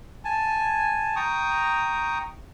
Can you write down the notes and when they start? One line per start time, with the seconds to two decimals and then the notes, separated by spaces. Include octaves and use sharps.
0.25 G#5 A5
1.16 G5 A#5 C#6 D#6